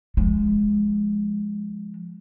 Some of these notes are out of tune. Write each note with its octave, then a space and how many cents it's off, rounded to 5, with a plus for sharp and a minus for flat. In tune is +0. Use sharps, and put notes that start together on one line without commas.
F3 +0 G#3 +0